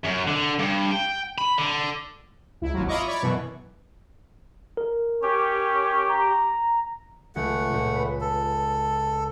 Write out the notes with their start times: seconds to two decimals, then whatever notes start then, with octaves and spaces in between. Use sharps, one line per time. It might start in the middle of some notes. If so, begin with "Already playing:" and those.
0.05 F#2
0.28 D3
0.59 G2
0.92 G5
1.38 B5
1.58 D3
2.61 C#2 E4
2.74 G#1 D#2 F3 F#3
2.87 E4 F4 D#5 A#5 C#6 D6
3.07 C#5 D5 B5 C#6
3.22 F#2 B2 E3
4.77 A#4
5.23 C#4 G4 C#6
6.10 A#5
7.36 C#2 A3 F#5
7.73 C#2 A#2
7.95 B4
8.21 A4